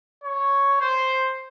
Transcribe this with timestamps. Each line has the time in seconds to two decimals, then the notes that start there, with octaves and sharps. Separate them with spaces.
0.24 C#5
0.81 C5